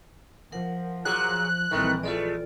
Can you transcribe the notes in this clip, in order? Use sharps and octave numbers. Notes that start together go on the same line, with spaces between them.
F3 A#4 F#5
A#2 F#3 G#4 F#6
A#1 D#3 E3 G3 A3 C4 A#4 C#6
G#3 A3 F4 A4 D5